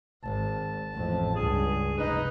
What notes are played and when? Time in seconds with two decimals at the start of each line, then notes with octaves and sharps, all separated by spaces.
0.24 G#1 A5
0.94 A1 F2
1.36 C#2 G2 G#4
1.98 F1 D#4 B4